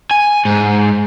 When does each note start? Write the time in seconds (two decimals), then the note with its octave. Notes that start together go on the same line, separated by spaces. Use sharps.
0.11 G#5
0.45 G#2